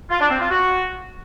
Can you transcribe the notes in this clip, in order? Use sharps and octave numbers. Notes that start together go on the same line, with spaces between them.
F4
D4
C4
F4
F#4